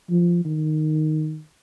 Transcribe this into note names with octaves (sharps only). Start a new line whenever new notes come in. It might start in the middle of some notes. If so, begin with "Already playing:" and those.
F3
D#3